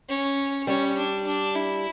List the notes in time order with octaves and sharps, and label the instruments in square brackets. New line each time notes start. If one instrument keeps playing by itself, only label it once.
[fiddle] C#4
[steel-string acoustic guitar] G3 [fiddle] C#4
[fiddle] D4
D4
E4